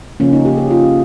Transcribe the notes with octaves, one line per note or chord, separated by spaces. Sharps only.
C#3 F3 A#3 C#4
D#4
G4
G#4
F4